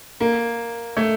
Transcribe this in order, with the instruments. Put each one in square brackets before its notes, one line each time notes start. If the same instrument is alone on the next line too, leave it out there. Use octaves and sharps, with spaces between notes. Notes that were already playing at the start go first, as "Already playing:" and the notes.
[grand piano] A#3
A3